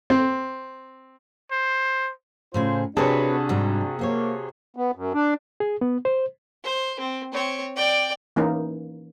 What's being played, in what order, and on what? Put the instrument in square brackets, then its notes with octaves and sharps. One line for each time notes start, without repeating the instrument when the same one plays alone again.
[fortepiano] C4
[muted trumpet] C5
[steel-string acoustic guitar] A2 C#3 G#4 [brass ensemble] F4 C5
[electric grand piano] C3 G#4 A5 [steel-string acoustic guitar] C4 B4 C#5 [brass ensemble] D4 F#4
[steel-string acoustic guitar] G#2 G3
[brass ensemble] A#3 [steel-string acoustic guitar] F#4 C5 C#5
[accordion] B3
F#2
D4
[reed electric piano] G#4
B3
C5
[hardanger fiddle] C5
C4
C4 C#5
D5 G5
[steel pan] E3 A#3 C#4 D#4